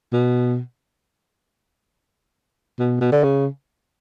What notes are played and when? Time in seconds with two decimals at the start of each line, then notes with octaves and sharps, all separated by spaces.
0.13 B2
2.79 B2
3.01 B2
3.12 D3
3.23 C#3